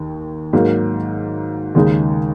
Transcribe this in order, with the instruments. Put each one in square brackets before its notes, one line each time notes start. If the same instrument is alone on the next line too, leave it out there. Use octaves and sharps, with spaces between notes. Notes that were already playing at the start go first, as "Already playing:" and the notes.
Already playing: [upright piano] D#2 D#3
G#2 F#3 A#3
D#2 C#3 G#3 D#4